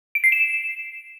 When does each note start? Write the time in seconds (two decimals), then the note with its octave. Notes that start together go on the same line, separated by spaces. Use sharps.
0.15 D7
0.24 C7
0.32 E7